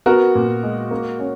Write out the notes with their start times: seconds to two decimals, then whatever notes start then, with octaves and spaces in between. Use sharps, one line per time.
0.06 B3 F#4 A#4
0.35 A#2
0.63 G#3
0.91 A#3
1.19 C#4